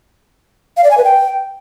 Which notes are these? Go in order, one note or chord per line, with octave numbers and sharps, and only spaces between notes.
F5
D5
G#5
B4
G5